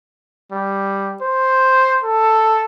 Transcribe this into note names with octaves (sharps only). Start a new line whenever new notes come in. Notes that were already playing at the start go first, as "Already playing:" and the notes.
G3
C5
A4